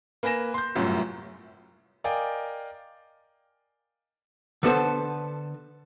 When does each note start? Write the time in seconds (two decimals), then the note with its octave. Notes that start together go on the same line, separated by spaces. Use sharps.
0.23 A#3 B4 G#5 A#6 E7
0.54 C6 G6
0.75 G1 C2 F#2 A2 F4
2.04 A#4 D5 D#5 F5 G5 G#5
4.63 D3 B3 A4 C5